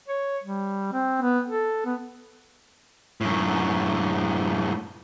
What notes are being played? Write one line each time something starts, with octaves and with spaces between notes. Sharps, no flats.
C#5
G3
C4
B3
A4
B3
F#2 A2